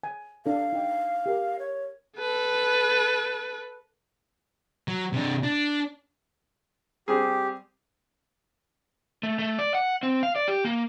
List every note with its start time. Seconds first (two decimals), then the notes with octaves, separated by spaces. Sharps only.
0.03 G#5
0.46 D4 A4 F5
0.73 D#4 G5
1.26 G4 A#4
1.59 C#5
2.18 A4 B4
4.88 F#3
5.13 C3 D4
5.43 D4
7.08 G3 C4 G4 G#4
9.23 A3
9.39 A3
9.59 D5
9.75 F#5
10.03 C4
10.23 F5
10.36 D5
10.48 G4
10.65 A#3